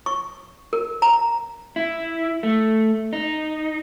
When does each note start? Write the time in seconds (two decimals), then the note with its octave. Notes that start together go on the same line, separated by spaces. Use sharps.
0.06 C#6
0.73 A#4
1.02 A#5
1.76 E4
2.43 A3
3.13 D#4